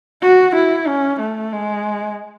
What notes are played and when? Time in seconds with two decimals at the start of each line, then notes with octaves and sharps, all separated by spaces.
0.22 F#4
0.55 E4
0.88 C#4
1.20 A3
1.53 G#3